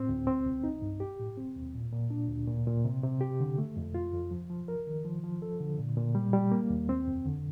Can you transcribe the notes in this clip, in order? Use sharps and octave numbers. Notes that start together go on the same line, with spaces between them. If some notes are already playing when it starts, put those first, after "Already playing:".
Already playing: A2 C4
D2
C4
C2
D#4
G2
G4
A2
C4
D#2
A#2
A#2
D4
D2
A#2
A#2
C3
C3
G4
D3
A3
F2
F4
F2
F3
F3
A#4
D#3
F3
F3
A4
D3
A#2
A#2
G3
G3
A#3
D#2
C4
F2
D3